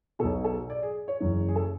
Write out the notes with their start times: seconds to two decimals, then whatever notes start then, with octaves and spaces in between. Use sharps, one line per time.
0.19 B2 A4
0.24 B1
0.45 A4
0.70 D5
0.83 G#4
1.08 C#5
1.20 F#1 F#2 E3
1.48 G#4
1.56 A4